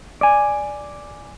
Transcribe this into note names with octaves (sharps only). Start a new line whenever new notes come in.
D5 G#5